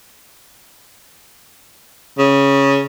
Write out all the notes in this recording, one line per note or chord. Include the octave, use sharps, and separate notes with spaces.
C#3